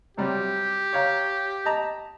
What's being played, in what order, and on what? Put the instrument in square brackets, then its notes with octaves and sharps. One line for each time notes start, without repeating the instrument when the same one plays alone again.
[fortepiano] C3 F#3 G3 [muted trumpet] G4
[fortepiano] C#5 F5 A#5
D#5 A5 A#5